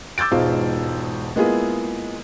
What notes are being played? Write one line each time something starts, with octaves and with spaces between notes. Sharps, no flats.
D6 E6 G6 A6 D7
E1 G#2 B2 F4 C5 F5
G#3 A#3 B3 E4 F4 G#4